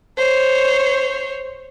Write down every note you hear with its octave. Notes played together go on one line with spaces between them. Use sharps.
C5 C#5